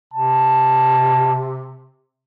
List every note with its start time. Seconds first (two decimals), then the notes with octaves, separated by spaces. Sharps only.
0.14 C3 A5